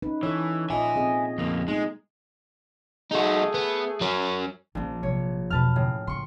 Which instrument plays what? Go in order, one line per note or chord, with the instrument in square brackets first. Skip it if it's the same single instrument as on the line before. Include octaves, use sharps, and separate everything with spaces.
[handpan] C#4 D#4 B4
[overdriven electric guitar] E3 [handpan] A4 C#5
[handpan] A#2 F4 D#5 [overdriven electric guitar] E5 G#5
[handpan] C4 G#4 D#5
[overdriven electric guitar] F2 A#3 [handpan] B3
[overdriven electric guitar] G#3 [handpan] A3 D#4
[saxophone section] A3 G#4 [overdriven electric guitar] D#4 F#4
[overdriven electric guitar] B3
F#3 C#4
[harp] A#1 [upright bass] F3 C#4
[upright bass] C3 F#3 [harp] C#5
[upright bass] E2 B2 [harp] B4 A5 F6
[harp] A2 C#3
[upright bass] C#3 [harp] C6 C#6